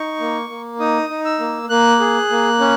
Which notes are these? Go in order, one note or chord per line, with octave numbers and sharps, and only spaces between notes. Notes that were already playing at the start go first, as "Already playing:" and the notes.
Already playing: D#4 C#6
A#3
A#3
D#4 D#6
D#4
E6
A#3
A#3 F#6
G#4
A#3
C#4